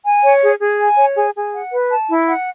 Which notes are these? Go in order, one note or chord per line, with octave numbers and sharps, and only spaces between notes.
G#5
C#5
G#4
G#4
G#5
C#5
G#4
G#4
F#5
B4
A5
E4
F#5